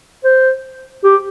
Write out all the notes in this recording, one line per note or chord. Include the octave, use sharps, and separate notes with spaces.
C5
G4